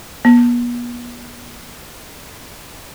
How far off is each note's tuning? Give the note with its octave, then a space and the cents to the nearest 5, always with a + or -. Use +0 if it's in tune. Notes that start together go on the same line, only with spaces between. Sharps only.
B3 -40